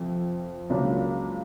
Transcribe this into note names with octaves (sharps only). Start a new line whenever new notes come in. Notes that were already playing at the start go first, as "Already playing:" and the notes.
Already playing: F2 C3
C#2 C#3 F#3 A#3 D4